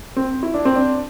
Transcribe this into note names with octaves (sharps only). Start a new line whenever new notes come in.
C4
E4
D4
C4
D4